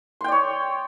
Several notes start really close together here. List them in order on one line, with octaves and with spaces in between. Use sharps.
C6 G5 D5 C#5